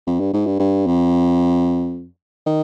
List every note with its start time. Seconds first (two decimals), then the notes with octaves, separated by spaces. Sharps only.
0.07 F2
0.20 G2
0.33 G#2
0.46 G2
0.59 G2
0.86 F2
2.46 D#3